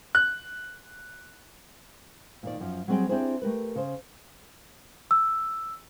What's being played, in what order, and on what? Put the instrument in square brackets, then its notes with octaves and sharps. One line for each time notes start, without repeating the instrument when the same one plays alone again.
[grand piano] F#6
[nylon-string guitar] A#2 D#3 D5
F#2 F3
F#3 G3 C4 G#4 D#5 G5
C4 D4 E4 G4 G#4 C5
A3 G4 A#4 B4
C#3 C5
[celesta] E6